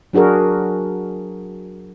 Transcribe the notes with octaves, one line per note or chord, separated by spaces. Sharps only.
F#3 D4 F#4 G#4 A#4